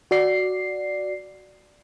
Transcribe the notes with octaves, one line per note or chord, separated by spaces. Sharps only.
F#4 D5 C7